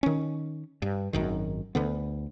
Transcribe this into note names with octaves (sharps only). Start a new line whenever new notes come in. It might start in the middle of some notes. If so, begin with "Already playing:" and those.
D#3 C#4
G2
G#1 F#2 D#3
D2 D3 B3